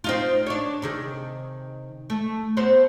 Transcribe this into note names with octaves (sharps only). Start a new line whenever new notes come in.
C4 D#4 F4
D4 C#5
C3 D#3 G#4
A3
B3 C4 C5